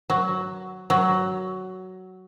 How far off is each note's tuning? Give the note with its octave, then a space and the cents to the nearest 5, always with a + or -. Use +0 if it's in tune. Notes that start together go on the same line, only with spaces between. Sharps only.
F#3 +5
F#3 +10